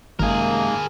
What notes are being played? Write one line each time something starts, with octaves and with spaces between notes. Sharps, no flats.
G#1 F#2 C3 D#3 G#3 A#3 G#4 A#4